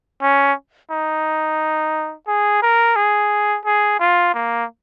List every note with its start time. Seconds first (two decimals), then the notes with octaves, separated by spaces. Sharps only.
0.22 C#4
0.90 D#4
2.27 G#4
2.62 A#4
2.96 G#4
3.65 G#4
3.99 F4
4.34 A#3